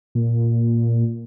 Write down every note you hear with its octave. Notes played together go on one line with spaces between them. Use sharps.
A#2